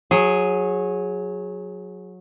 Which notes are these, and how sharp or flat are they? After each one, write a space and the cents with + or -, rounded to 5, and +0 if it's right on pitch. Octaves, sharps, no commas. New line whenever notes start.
F#3 -20 G#4 +0